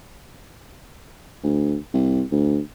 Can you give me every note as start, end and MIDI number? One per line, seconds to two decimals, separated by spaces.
1.43 1.76 38
1.94 2.23 36
2.31 2.59 38